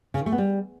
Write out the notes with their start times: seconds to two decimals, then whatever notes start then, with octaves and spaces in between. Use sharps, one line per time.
0.14 C#3
0.20 D#3
0.26 A3
0.32 B3
0.38 G3